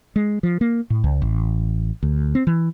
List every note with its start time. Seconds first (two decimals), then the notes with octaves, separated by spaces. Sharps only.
0.16 G#3
0.43 F3
0.61 A#3
0.90 A2
1.04 C#2
1.22 A1
2.03 D2
2.35 C4
2.47 E3